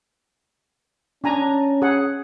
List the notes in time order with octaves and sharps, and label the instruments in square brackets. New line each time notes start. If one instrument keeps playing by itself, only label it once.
[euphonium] C#4 [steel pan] D4 G#5 A#5
[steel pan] G#4 F#5